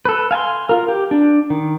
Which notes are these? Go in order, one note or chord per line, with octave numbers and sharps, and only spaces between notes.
A4 B4
F5 G#5 A5 C6
F4 A#4
G4
D4
D#3